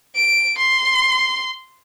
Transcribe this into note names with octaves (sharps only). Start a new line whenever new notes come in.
D7
C6